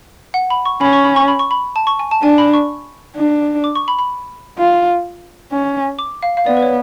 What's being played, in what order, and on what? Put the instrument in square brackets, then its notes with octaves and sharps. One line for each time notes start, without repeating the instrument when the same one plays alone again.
[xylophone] F#5
B5
C#6
[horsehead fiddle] C#4 [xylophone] B5
[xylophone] C#6
B5
C#6
B5
C#6
B5
A5
C#6
G#5
A5
[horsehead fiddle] D4 [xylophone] G#5
[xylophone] B5
C#6
[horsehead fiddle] D4
[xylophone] D6
C#6
B5
B5
[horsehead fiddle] F4
C#4
[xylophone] D6
F5
F5
[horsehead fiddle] B3 [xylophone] D5
[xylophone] B4
C#5